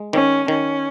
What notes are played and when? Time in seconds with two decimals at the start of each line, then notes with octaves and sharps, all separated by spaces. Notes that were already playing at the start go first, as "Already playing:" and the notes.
Already playing: G#3
0.13 D#3 C#4
0.48 D#3 C#4